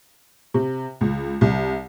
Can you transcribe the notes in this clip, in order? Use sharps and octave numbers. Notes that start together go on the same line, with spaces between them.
C3
C#2
C2